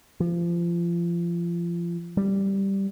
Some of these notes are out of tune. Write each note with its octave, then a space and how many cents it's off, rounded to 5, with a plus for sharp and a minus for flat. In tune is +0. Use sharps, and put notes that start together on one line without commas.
F3 -30
G3 -5